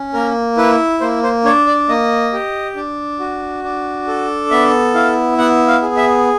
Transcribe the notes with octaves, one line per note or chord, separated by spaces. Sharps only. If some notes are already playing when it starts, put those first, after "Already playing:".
Already playing: C#4
A#3 A#4
E4 B4
A#3 C5
C5
D4 C#5
D5
A#3 D#5
G4
D4
F#4
D4
A4
B3 E5
E4 F5
B3 F#5
F5
G#4
E5